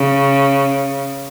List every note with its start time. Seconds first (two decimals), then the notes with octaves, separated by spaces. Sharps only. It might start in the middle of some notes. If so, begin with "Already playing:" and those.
Already playing: C#3